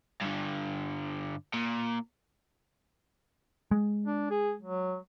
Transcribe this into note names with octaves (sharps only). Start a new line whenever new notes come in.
G2 D3
A#2
G#3
D4
G#4
F#3